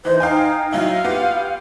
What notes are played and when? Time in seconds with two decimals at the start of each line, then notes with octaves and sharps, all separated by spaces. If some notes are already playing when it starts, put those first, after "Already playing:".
0.05 E3 D#4 C5
0.20 D#4 F5 G5 G#5
0.72 F#3 D#4 E4 F5
1.04 B3 F4 G4